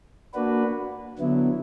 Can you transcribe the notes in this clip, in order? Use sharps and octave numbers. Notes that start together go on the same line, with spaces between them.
A#3 D4 F#4 B4
D3 F#3 B3 E4